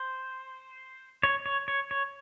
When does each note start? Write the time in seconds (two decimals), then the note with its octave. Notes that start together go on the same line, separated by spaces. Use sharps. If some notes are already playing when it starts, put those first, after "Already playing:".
Already playing: C5
1.23 C#5
1.46 C#5
1.68 C#5
1.91 C#5